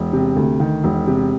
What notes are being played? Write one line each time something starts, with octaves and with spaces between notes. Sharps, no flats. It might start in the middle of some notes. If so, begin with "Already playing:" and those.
Already playing: E1
C3
D2
D#3
E1
C3